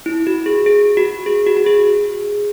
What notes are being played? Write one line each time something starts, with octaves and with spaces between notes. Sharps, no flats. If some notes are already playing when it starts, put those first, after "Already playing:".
E4
F#4
G#4
G#4
F#4
G#4
F#4
F#4
G#4